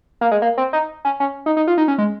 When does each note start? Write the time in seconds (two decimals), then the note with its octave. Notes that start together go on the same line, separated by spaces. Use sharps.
0.21 A#3
0.31 G#3
0.42 A#3
0.58 C4
0.73 D#4
1.05 C#4
1.20 C#4
1.46 D#4
1.57 D#4
1.67 F4
1.78 D#4
1.88 C#4
1.98 G#3